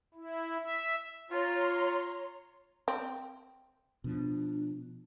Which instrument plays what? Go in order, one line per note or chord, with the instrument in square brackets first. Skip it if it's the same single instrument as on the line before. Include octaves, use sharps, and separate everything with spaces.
[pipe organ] E4
E5
[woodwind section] F4 [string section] C#5 A#5 C6
[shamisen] C4
[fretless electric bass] B2 F3 [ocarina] D4